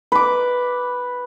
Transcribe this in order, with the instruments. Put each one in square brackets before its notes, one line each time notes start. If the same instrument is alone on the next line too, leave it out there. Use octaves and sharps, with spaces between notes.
[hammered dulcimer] B4 D6